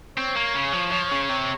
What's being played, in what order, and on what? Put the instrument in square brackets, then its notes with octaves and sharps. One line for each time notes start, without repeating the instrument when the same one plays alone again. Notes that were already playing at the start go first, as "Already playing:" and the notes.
[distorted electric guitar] C4 [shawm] C#5
[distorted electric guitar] A#3
C#3
F3
F3
C#3
C3